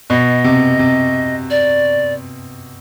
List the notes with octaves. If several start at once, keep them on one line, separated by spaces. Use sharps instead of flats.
B2 D#5
C3
C3
D5